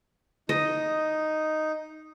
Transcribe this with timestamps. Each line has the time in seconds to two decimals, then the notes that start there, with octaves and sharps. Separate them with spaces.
0.49 D#4 D#5